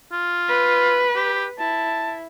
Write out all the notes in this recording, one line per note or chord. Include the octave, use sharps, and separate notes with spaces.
F4
B4
G4
E4 A5